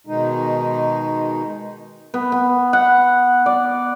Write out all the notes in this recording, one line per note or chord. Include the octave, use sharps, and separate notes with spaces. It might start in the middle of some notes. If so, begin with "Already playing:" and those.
B2 D#3 G#3 D#4
B3
B3
F#5
D5